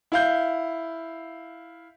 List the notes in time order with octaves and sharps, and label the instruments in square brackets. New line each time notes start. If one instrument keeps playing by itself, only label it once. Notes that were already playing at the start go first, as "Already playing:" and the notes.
[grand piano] E4 F5 G6